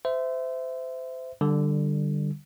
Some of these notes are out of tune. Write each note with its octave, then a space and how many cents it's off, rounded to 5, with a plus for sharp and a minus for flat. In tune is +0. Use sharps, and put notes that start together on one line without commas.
C5 -30 E5 +0
D3 +15 G3 +0